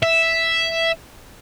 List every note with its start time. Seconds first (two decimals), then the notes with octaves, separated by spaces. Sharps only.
0.03 E5